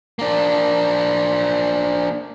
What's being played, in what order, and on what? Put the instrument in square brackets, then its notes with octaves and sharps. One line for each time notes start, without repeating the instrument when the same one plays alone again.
[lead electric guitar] A#3 D4